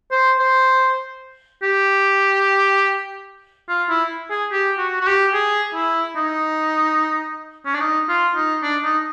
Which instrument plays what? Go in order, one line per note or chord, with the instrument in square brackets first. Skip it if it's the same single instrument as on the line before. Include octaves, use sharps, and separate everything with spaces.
[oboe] C5
C5
G4
F4
E4
G#4
G4
F#4
F#4
G4
G#4
E4
D#4
C#4
D4
D#4
F4
D#4
D4
D#4